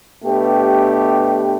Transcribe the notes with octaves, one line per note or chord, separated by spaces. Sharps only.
B2 A3 D4 G4 B4